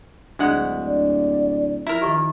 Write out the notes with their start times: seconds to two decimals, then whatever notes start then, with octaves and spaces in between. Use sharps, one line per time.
0.39 D1 D2 G#3 D4 F#5
0.84 D5
1.87 F3 E4 A#4 A#5
2.02 D#3 G4 D#5 C#6